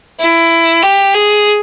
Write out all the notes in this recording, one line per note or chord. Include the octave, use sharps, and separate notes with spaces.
E4
G4
G#4